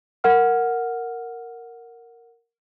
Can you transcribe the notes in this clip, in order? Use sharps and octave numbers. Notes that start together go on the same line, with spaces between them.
A#4 F#5 F6